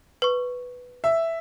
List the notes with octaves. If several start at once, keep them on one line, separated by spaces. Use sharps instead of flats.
B4 C#6
E5